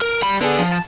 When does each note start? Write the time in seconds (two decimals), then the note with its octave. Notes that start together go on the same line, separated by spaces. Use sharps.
0.02 A#4
0.23 G3 B5
0.41 D3 B3 D4 G#4
0.59 F3
0.72 A5